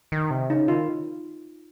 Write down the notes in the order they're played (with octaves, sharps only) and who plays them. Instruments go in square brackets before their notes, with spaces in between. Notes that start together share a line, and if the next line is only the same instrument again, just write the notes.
[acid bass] D#3
C3
[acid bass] C#3 [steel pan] D#4
[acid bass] D#3 [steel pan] F4